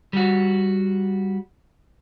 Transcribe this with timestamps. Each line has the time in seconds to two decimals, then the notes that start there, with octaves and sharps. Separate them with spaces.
0.13 G3 F#4